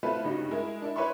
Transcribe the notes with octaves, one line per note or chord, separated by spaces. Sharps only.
A3 C4 E4 F4 B4
G2 C#3 G3 D#4 F#4
G#3 E4 A#4
D4 E4
B4 C#5 E5 C6 C#6